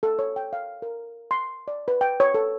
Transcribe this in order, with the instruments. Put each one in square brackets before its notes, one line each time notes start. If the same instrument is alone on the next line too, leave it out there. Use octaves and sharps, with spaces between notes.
[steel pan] A4
C#5
G5
F5
A#4
C6
D5
B4
G5
C#5
A4